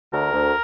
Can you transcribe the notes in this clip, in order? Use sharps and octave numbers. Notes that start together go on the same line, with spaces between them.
D2 A#4
D2